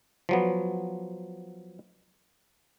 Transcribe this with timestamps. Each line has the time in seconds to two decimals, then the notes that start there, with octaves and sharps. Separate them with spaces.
0.29 F3 F#3 B3